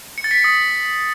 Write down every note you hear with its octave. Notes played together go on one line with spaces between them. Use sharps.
C#7
A6
B6
C#7
D#6